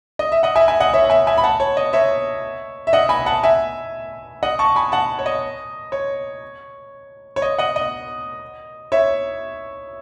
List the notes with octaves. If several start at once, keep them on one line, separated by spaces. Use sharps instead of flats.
D#5
E5
D#5 F#5
E5 G#5
E5 G#5
D#5 F#5
C#5 E5
F#5
E5 G#5
E5 G#5
B5
F#5 A5
C#5
D#5
C#5 E5
E5
D#5 F#5
G#5 B5
F#5 A5
E5 G#5
D#5 F#5
A5 C#6
G#5 B5
F#5 A5
C#5
D#5
C#5
C#5
D#5
D#5 F#5
D#5
C#5 E5